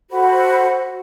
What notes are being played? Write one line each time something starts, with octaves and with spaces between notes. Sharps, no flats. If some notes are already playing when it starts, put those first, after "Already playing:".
F#4 A4 C5 B5